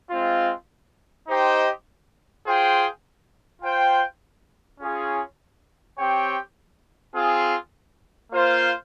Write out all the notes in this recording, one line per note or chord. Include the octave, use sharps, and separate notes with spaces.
G#3 C4 F4
D#4 G4 C5 D#5 G5
F4 G#4 C5 G5
F4 C5 G5
C#4 F4 G#4 C#5
C4 G4 C#5 G5
C4 F4 G#4
A#3 F4 C5 F5